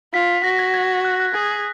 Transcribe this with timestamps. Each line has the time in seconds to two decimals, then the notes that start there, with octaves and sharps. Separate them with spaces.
0.13 F4 B6
0.44 F#4 A#6
0.59 G#6
0.74 G#6
1.05 F#6
1.20 F#6
1.34 G#4 G#6